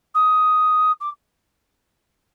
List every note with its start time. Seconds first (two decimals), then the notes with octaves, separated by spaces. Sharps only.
0.14 D#6
1.00 D6